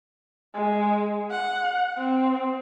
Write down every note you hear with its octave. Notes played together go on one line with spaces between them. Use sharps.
G#3
F#5
C4